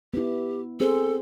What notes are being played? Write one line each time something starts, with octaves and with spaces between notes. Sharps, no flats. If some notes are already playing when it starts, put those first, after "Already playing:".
B3 E4 G4
C4 G#4 A4 C5